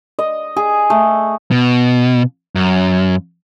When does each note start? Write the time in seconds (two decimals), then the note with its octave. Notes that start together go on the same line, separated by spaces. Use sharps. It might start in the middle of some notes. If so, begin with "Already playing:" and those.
0.19 D#5
0.57 G#4
0.90 A3
1.51 B2
2.55 F#2